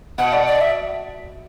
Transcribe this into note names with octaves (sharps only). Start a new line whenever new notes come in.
B2 F#5
D5
D5
E5